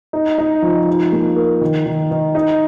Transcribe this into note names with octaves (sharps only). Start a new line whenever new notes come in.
D#4
D#4
F3
D#4
A#3
A#4
D#3
D#3
D#3
D#4